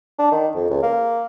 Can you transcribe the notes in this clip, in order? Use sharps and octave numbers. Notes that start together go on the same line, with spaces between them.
D4
D#3
F2
C#2
A#3